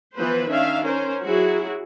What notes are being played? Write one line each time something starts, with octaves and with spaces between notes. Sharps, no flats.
E3 F3 B3 B4 C5
D#3 C#4 D4 E5 F5
C#4 A#4 C5
F#3 E4 F#4 G#4